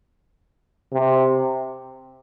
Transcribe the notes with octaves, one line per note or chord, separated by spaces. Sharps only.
C3